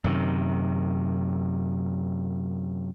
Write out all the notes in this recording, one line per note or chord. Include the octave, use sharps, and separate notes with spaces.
F#2 C3 D#3